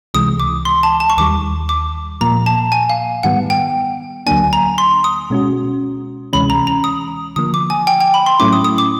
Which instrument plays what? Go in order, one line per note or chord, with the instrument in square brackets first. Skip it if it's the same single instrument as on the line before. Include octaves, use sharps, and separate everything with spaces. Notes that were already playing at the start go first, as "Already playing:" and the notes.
[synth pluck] C#2 C3 E3 G#3 [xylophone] D#6
[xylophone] D6
C6
A5
A5
C#6
[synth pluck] D#2 D#3 G3 [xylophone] D6
[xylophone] D6
[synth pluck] A#2 F3 A#3 [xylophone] A#5
[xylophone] A5
G#5
F5
[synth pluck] G#2 D#3 G3 B3 [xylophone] F#5
[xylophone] G5
[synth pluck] D2 D3 F#3 A#3 D4 [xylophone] G#5
[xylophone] A#5
C6
D#6
[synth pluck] B2 G#3 C#4 F#4
[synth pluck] D2 C3 E3 G#3 C#4 [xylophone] B5
[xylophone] A#5
A#5
D#6
[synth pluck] D3 F3 A#3 [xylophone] D#6
[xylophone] D6
G#5
G5
G5
B5
C6
[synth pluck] A2 F#3 A3 C#4 E4 [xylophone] D6
[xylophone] D#6
D#6
D6